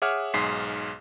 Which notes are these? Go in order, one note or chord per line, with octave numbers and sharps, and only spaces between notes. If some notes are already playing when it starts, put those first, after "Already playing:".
G#4 C#5 E5 F#5 D6 F6
B1 G#2 G#4 C6 B6 C7